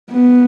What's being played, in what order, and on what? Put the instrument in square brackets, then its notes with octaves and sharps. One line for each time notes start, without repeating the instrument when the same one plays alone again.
[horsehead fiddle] B3